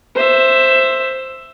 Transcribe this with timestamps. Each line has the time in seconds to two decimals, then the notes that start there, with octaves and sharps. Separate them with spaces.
0.15 C5 E5